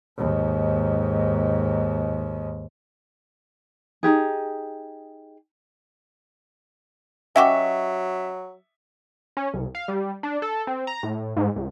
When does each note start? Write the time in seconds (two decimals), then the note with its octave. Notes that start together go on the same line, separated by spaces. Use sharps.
0.18 D#2 G#2
4.03 D#4 F4 G4 G#4
7.36 F#3 C#4 F#4 G4 D#5 E5 C#6
9.37 C#4
9.54 C2
9.75 F5
9.88 G3
10.23 D4
10.42 A4
10.67 C4
10.87 A#5
11.03 A2
11.37 G#2
11.56 C#2